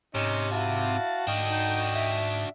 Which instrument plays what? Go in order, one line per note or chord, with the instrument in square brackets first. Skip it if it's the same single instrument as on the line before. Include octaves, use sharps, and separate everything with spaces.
[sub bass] G#2 [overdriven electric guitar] C3 [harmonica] C#4 D#4
[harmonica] E4 F#4 A5 [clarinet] F5
[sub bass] G#2 [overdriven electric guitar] D4 F#4 [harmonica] D#5 G5
[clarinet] D#4
E5